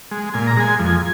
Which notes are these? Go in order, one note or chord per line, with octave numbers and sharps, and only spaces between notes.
G#3
A#2 G#5
A#5
G#3 G#5
F2